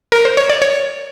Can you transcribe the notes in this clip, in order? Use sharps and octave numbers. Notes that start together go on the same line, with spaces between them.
A#4
C5
C#5
D5
C#5